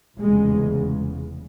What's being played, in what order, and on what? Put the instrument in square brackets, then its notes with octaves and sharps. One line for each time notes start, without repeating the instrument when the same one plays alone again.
[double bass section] F1 E2 C#3 G#3